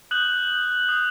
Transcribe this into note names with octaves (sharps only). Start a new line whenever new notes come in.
D#6 F#6 G6 F#7
D#6 G6